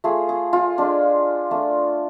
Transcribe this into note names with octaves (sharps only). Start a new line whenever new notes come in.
A3 F4 G#4
G#4
F4
G#3 D4 F4
A3 D4 F4